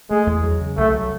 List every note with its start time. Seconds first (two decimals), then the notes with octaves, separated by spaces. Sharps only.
0.10 G#3 A3
0.27 E2
0.44 F#3
0.60 C#3
0.77 C2 A3
0.94 F#3